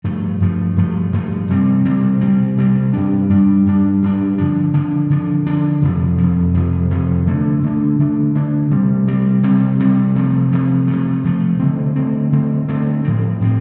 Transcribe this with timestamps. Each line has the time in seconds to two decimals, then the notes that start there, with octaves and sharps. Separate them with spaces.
0.04 G2 F3 A3
0.40 G2 F3 A3
0.77 G2 F3 A3
1.13 G2 F3 A3
1.49 C3 G3 C4
1.85 C3 G3 C4
2.21 C3 G3 C4
2.57 C3 G3 C4
2.93 G2 G3 D4
3.30 G2 G3 D4
3.66 G2 G3 D4
4.02 G2 G3 D4
4.38 D3 F3 D4
4.74 D3 F3 D4
5.10 D3 F3 D4
5.47 D3 F3 D4
5.82 F2 C3 F3
6.18 F2 C3 F3
6.54 F2 C3 F3
6.91 F2 C3 F3
7.27 D3 A3 D4
7.62 D3 A3 D4
7.99 D3 A3 D4
8.35 D3 A3 D4
8.71 C3 G3 C4
9.07 C3 G3 C4
9.43 C3 G3 C4
9.79 C3 G3 C4
10.15 C3 F3 A3
10.51 C3 F3 A3
10.87 C3 F3 A3
11.24 C3 F3 A3
11.59 D3 A3 C4
11.96 D3 A3 C4
12.32 D3 A3 C4
12.68 D3 A3 C4
13.04 A2 F3 C4
13.41 A2 F3 C4